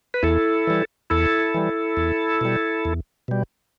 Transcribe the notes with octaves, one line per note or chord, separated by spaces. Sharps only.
B4
E2 E4 A4
E3 G3
E2 E4 A4
E3 G3
E2
B2 G3
E2
B2 G3